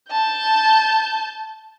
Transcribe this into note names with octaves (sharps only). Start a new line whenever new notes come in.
A5 G6